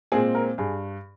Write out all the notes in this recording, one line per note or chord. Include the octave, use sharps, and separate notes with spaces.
A#2 G#3 C4 G#4
A#4
G2 G#4